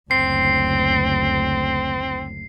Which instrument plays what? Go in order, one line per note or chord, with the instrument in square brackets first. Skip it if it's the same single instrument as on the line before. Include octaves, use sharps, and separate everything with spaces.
[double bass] F#1 D2 [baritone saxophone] C4 [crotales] C7